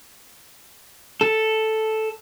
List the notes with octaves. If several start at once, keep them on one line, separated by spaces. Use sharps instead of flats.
A4